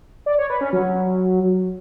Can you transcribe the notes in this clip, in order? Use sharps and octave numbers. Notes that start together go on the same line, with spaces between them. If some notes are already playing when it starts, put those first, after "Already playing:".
D5
C#5
B4
C#4
F#3